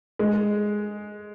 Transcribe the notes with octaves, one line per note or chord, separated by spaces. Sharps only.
G#3